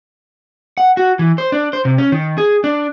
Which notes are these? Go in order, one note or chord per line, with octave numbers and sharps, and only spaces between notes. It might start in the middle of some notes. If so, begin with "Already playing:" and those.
F#5
F#4
E3
C5
D4
C5
C3
C#4
D#3
G#4
D4